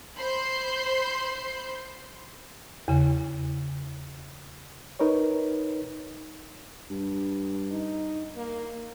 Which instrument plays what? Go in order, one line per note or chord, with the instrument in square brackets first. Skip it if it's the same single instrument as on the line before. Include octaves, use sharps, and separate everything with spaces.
[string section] C5 B5 C6 G6
[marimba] E2 C#3
[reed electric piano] D#4 A#4 B4 C#5
[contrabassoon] G2
[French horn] D#4
A#3